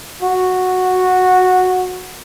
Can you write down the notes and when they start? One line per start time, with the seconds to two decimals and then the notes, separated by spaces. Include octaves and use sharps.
0.22 F#4